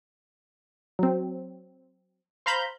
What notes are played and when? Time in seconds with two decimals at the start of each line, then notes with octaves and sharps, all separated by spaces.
0.99 F#3 C4
2.46 C5 F5 A#5 B5 G6